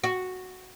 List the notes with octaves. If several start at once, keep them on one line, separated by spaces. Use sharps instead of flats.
F#4